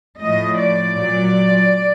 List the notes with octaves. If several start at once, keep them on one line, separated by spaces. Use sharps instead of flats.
A2 F3 D#5
D5
A#2 F#3